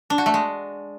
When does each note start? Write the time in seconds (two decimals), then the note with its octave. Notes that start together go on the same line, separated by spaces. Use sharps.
0.10 D4
0.18 F#4
0.26 A3
0.34 G#3